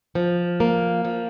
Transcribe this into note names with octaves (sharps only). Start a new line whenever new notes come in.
F3
A#3
F3